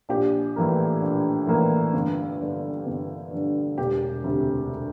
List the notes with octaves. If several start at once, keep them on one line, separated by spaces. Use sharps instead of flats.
A#1 G4
A2 E3 A#3
A#1
A2 E3 A#3
G1
G2 D3
G1
G2 D3
E1 G4
D2 C3